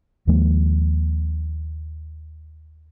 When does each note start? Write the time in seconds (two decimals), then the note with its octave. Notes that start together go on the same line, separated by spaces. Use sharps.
0.27 D#2 F3 G#3 A#3